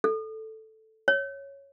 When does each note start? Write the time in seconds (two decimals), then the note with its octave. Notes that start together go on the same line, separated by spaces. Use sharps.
0.04 A4
1.08 C#5